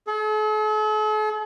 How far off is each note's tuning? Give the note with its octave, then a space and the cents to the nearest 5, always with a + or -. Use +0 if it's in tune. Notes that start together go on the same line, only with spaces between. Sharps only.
A4 -45